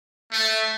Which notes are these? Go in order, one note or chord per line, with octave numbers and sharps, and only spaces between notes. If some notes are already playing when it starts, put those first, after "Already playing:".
A3